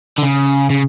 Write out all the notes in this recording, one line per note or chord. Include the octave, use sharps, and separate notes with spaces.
D3
C#3
C#3